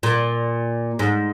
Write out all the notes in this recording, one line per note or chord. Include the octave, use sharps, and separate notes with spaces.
A#2
G#2